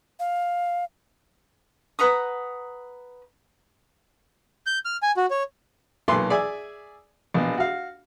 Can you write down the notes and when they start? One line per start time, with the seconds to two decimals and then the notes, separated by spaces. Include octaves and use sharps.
0.20 F5
1.99 B4 F#5 A#5 D#6
4.66 G6
4.85 F6
5.03 G#5
5.17 F#4
5.31 C#5
6.08 B1 A#2 A4 B4 C6 D6
6.30 G#4 D5 E5 G#5
7.34 A#1 B2
7.57 F#4 F5